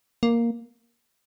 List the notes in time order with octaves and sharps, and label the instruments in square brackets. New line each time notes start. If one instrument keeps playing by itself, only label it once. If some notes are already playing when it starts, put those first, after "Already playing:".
[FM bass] A#3